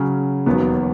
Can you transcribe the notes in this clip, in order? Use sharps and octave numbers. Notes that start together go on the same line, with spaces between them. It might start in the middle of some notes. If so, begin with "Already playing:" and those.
Already playing: C#3 F#3 C#4
E1 D#2 D#3 F#3 B3